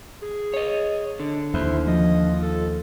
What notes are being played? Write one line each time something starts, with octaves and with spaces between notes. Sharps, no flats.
G#4
C#5 D#5
D3
D#2 E4 C5
F3 D#5
A4